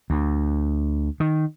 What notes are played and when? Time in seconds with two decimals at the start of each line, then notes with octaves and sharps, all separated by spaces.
0.10 D2
1.20 D#3